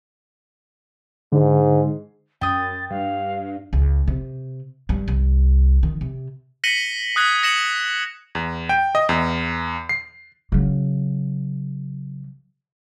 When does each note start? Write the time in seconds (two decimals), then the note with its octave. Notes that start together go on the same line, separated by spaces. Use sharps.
1.32 G#2 D3
2.41 F#2 G5 D#6 A6
2.90 G2 F5
3.73 C#2
4.08 C3
4.89 G2
5.08 C2
5.83 D#3
6.01 C3
6.64 A#6 B6 C#7 D#7 F#7 G7
7.16 D#6 F#6 G#6 B6
7.43 D#6 A#6 C#7 E7 F#7
8.35 E2
8.69 G5
8.95 D#5
9.09 E2
9.89 C7
10.52 C#3 F#3